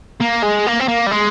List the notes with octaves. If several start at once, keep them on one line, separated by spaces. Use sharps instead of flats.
A#3
G#3
A#3
C4
A#3
G3
G#3